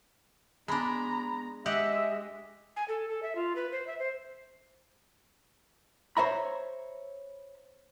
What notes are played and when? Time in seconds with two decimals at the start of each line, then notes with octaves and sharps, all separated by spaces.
0.68 G#3 B3 D4 A#5 B5
1.66 G#3 G4 D#5 E5 F#5
2.76 G#5
2.88 A4
3.08 A4
3.23 E5
3.35 F4
3.56 B4
3.72 C5
3.87 E5
3.98 C5
6.17 C5 C#5 E5 A#5 B5